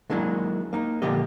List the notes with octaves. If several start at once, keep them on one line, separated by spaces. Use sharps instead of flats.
D#3 F#3 G#3 A#3 D4 E4
A#3 D#4
A#2 D3 F3 A#3 G4 D#5